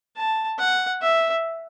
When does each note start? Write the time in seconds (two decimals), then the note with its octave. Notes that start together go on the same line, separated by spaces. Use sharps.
0.17 A5
0.59 F#5
1.02 E5